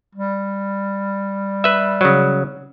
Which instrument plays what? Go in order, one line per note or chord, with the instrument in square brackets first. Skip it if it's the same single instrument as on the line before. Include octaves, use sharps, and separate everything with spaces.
[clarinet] G3
[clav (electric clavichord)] B4 E5
C#3 F#3